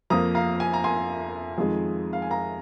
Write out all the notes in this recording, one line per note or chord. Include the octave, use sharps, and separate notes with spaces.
F2 F3 A#3 A#5 D#6
F5 A#5
G#5
A#5
G#5 C6
F2 D#3 G#3
F5
G#5
F5 A#5